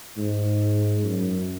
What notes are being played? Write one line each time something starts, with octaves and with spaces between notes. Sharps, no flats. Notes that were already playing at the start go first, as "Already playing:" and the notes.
G#2
F#2